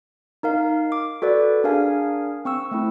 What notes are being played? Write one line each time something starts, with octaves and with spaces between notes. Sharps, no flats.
D#4 A#4 F5
D6
F#4 A4 B4 D5
D4 G#4 A#4 F5 G#5
C4 C#6 E6
A3 C4 E4